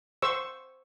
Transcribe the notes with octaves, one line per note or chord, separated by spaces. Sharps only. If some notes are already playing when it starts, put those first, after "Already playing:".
C5 C#6 E6